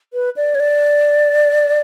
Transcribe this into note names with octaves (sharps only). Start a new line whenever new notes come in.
B4
D5
C#5
D5